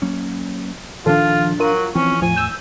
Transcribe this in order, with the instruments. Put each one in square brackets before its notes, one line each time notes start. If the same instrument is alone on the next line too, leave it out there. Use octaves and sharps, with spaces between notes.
[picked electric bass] F#3 A#3 C#4
[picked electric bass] A#2 D4 [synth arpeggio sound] D#3 F3 A4 [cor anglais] F4
[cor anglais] F#3 [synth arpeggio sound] F4 A#4 D#7
[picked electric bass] E3 F3 [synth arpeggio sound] C4 [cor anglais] C#4
[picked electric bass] E2 A2 [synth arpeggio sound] F3 [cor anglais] G#5
[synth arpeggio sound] E6 G6